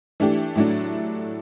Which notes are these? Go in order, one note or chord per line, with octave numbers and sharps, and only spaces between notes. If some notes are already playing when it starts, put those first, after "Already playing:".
E3 A3 D4 G4
A2 F#3 A3 D4